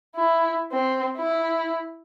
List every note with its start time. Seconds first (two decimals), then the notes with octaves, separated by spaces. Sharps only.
0.16 E4
0.72 C4
1.18 E4